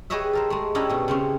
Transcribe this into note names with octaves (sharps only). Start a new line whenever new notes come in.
G4 G#4 B4 C#5 D#5 E5
A4 A#4 C5
G#3 A3
C#4 D4 E4 G4 A#4 D#5
B2 A3
C#3 C4 C#4